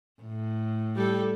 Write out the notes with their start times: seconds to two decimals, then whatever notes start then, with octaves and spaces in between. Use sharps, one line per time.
0.22 A2
0.95 G3 A4